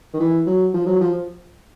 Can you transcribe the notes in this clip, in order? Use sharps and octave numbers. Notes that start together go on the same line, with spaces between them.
D#3
E3
F#3
F3
F#3
F3